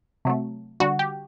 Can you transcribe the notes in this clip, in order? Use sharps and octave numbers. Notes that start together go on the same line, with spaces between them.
C3 F#3 A3
D3 G3 F#4
G4